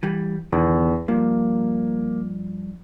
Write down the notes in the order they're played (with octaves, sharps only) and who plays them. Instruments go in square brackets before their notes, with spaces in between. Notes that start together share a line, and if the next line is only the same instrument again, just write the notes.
[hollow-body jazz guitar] E3 G3
[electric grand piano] E2 [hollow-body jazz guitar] B2 D3 D#3
[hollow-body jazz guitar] G2 F3 [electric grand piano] A#3